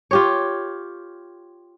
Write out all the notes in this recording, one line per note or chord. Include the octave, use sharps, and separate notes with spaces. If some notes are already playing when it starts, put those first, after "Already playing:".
F4 G4 C#5